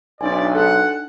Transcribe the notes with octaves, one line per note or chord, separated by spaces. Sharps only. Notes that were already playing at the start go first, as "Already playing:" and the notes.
B1 D4 D#4 D5 G#5
A4 F#5